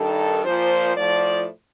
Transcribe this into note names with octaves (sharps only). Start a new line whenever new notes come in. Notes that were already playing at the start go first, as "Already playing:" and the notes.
Already playing: G2 D#3 A4
A#2 F3 C5
A2 F3 D5